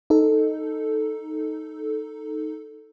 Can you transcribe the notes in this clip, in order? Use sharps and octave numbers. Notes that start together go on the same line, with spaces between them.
D#4 A4